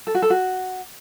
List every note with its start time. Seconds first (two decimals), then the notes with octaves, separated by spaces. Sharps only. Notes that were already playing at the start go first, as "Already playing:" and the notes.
0.07 A4
0.15 F#4
0.22 A4
0.30 F#4